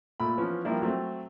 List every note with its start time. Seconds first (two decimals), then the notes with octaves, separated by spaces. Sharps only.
0.20 A#2 A3 B5
0.38 E3 F3 B3 C#4
0.64 F3 G3 A#3 D4 E4 G4
0.82 F#3 A3 C4